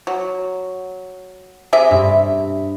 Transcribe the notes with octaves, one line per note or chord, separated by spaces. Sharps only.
F#3
C3 G#4 E5
G2